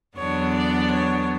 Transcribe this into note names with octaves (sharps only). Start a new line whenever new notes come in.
E2 D3 F#3 B3 D4 C#5
D5
C#5